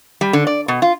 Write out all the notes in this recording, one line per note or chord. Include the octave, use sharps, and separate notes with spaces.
G3
D3
D5
B2
F4